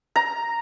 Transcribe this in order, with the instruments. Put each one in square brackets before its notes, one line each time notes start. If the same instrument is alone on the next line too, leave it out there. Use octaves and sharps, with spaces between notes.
[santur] A#5